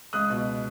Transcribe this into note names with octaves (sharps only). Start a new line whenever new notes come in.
C#2 D#6 F#6
B2